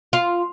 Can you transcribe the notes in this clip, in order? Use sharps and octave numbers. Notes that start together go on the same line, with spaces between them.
F4